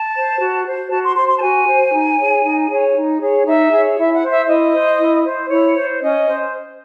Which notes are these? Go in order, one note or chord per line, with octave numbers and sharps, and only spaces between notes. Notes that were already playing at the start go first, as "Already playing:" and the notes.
Already playing: A5
C5
F#4
C5
F#4 A5
C6
C5 C6
C6
A5
F#4 G#5
C5
D#4
G#4 C#5
D#4
G#4 C#5
D#4
G#4 C#5
D#4 E5
G#4
C#5
E4 E5
F#5
C5
E5
E4 D#5
C5
E4
C5
E4 C#5
C5
C#4 D#5
C5